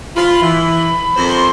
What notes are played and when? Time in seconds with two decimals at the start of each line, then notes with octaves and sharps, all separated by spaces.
0.16 F4 B5
0.42 E3
1.16 F2 A#4 C5
1.29 C6